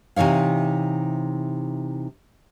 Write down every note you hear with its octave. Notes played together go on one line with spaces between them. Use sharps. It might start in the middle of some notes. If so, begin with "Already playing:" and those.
C3 E3 D#4 C#5 F5